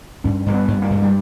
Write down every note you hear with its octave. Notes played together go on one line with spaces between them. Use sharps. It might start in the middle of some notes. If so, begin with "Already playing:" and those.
G2 C#4
G2 A#3
B3
G2
A#3
G2
G3